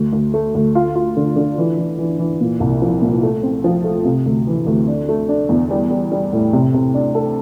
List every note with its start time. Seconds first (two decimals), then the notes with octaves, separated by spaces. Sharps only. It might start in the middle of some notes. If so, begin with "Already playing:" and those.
Already playing: D2
0.13 D2
0.34 A3
0.55 D2
0.75 F4
0.96 F4
1.17 D3
1.36 D3
1.58 E3
1.78 E3
1.99 E3
2.19 E3
2.41 A#2
2.60 C2
2.82 F3
3.02 A#2
3.23 A3
3.43 C4
3.64 F3
3.84 A3
4.05 C3
4.26 D2
4.47 E3
4.67 D2
4.88 D4
5.09 A3
5.29 D4
5.49 E2
5.71 G3
5.90 G3
6.12 G3
6.33 A2
6.53 C3
6.74 C3
6.94 D4
7.15 A4